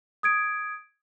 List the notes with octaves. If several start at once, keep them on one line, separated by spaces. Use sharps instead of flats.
D#6 G#6 D7